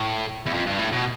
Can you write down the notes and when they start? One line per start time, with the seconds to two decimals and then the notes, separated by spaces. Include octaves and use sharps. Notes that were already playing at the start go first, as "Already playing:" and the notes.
Already playing: A2
0.46 E2
0.54 F2
0.67 G2
0.79 A2
0.92 B2